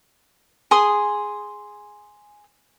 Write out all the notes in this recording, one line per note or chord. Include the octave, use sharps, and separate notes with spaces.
G#4 G#5 C6 D#6